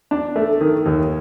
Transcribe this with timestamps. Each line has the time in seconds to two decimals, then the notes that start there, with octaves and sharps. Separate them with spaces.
0.11 D4
0.36 A3
0.61 D#3
0.86 D#2